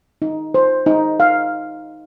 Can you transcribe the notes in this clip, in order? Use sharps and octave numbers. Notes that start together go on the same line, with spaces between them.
D#4
C5
D#4
F5